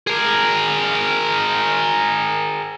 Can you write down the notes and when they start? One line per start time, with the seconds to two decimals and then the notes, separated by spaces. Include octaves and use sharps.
0.07 G#4 A#4